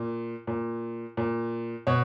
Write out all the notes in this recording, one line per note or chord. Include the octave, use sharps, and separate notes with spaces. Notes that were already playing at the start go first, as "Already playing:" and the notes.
Already playing: A#2
A#2
A#2
B2 C#5